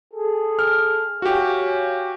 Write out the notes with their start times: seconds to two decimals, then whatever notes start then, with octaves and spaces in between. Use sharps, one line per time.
0.14 G#4 A4
0.59 F6
1.22 F#4 G4 C#5 F5 G#5